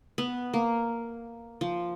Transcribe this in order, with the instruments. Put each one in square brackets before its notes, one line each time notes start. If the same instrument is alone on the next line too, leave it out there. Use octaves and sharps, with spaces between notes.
[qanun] B3
A#3
F3